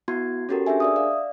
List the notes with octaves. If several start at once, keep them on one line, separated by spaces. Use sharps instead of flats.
B3 E4 F#4 C6 G#6
C#4 F#4 G4 A4 A#4
D4 G#4 A#4 E5 G#5
D5 E5 D#6
D5 F5